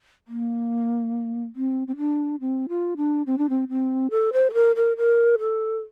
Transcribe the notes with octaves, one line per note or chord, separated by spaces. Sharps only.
A#3
C4
C4
D4
C4
F4
D4
C4
D4
C4
C4
A4
C5
A4
A#4
A#4
A#4
A4